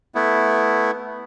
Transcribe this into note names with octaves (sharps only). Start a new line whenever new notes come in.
A3 B3 E4